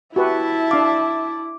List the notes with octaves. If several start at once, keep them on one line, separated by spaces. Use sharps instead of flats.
E4 F#4 G4 B4 E5 A5
D4 F5 D6